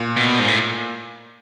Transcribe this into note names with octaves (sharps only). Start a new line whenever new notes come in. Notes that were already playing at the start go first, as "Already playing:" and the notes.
Already playing: A#2
B2
G#2
A2